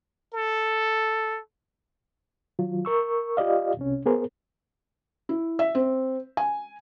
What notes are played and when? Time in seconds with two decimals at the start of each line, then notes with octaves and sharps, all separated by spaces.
0.34 A4
2.59 D#3 F#3 F4
2.85 A#4 C#6 E6
3.37 F4 G4 D5 D#5 F5
3.77 C2 C3 C#4
4.06 B3 G#4 A#4 C5
5.29 E4
5.59 E5
5.75 C4
6.37 G#5